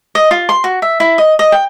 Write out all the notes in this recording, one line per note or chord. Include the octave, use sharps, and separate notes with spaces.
D#5
F4
C6
F#4
E5
E4
D#5
D#5
G5